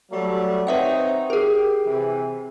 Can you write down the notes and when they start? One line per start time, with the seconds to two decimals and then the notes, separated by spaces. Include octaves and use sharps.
0.11 F#3 G3 A3
0.67 C4 D#4 B4 C#5 E5 F#5
1.30 G4 G#4 A#4
1.86 C3 E3